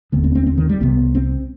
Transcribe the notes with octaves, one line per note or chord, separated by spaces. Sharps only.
F1 D#2 D3 B3
C4
C4
C4
D#3
G3
C2 C3 B3
C4